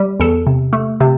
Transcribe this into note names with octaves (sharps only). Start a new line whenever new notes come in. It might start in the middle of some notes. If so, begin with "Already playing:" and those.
Already playing: G3
E2 A4
C3
A3
C3